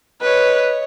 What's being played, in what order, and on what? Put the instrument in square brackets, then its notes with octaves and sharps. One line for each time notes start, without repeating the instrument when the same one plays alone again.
[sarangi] B4 [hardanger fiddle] C#5 D#5